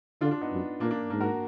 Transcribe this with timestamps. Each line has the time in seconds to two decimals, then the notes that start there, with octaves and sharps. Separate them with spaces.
0.21 D3 D4 F4
0.31 D4 F4
0.41 B3 D#4
0.51 F#2
0.80 A#2 A#3 D4
0.91 A#3 D4
1.10 G#2 A#3 D4
1.20 F#4 A#4